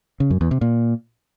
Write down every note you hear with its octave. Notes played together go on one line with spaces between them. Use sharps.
C#3
F#2
E2
C3
A#2